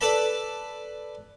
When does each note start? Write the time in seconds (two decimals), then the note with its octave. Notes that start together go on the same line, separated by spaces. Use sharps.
0.01 A4 B4 D5 A5 B5